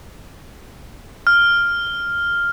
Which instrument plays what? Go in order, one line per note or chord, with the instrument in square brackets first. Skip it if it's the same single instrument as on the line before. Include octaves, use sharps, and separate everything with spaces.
[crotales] F6